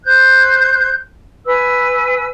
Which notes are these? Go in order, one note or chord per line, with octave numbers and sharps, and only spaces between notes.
C5 F#6 G6
B4 G#5 E6